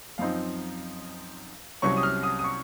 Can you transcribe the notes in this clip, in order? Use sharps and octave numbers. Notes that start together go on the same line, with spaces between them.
F#2 F3 C4 D#4 F5
C2 C3 F#3 C#4 C#6
D#6
F6
D#6
D#6
C#6